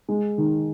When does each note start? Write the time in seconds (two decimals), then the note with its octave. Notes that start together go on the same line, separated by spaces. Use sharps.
0.09 G#3
0.38 D#3